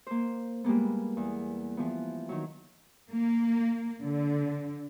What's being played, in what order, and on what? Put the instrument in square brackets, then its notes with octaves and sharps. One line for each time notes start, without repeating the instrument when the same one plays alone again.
[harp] A#3 C5
G3 G#3 A#3 B3
E2
E3 F3 B3
D#3 F#3
[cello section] A#3
D3